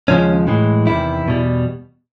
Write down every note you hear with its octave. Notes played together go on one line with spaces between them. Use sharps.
D#2 C#3 F3 G#3 C#4
A2 E3 G#3
E2 C3 D#3 E4
E2 B2 G3